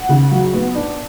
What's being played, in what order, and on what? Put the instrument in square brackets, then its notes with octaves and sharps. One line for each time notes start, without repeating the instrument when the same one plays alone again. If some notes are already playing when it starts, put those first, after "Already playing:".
Already playing: [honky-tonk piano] F#5
C#3
F#3
B3
D4